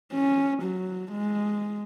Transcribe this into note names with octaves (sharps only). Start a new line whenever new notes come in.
C#4
F#3
G#3